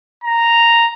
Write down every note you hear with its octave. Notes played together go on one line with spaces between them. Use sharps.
A#5